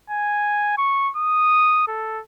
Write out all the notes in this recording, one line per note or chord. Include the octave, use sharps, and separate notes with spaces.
G#5
C#6
D#6
A4